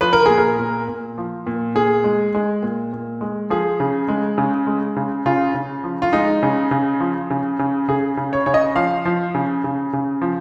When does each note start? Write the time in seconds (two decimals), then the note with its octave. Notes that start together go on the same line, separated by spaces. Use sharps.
0.01 F3 B4
0.13 A#4
0.26 A#2 G#4
0.38 A#4
0.58 A#2
0.88 A#2
1.18 F3
1.47 A#2
1.75 A#2 G#4
2.04 G#3
2.35 G#3
2.63 A#2
2.93 A#2
3.21 G#3
3.50 F3 G#4
3.80 C#3
4.08 G#3
4.38 C#3
4.67 G#3
4.96 C#3
5.26 C#3 F4
5.54 C#3
5.84 F3
6.02 F4
6.13 G#3 D#4
6.43 C#3
6.71 C#3
7.00 F3
7.30 C#3
7.59 C#3
7.88 C#3 G#4
8.17 C#3
8.33 C#5
8.46 C#3 C#5
8.54 D#5
8.76 F3 F5
9.05 F3
9.35 C#3
9.64 C#3
9.93 C#3
10.22 F3